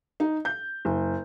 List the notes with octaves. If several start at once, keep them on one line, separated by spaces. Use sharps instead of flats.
D#4
G6
F#1